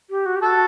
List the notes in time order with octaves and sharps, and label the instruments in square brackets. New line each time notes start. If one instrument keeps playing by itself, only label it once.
[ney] G4
F#4
G4
[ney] F#4 [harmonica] A4